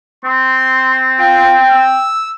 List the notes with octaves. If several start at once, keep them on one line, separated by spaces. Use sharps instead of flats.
C4 C6
F4 G5
E6